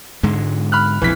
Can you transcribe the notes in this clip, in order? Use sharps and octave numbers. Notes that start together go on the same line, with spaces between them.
G#2 D3 G#3
B5 F6 F#6
A#1 F2 C3 E3 B6